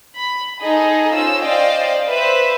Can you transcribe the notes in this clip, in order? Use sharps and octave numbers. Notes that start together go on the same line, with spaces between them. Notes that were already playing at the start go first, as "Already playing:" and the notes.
B5
D#4 G#4 A4 D#5
C#4 F4 C5 E6
C5 D5 D#5 F5 G5
B4 C5 E5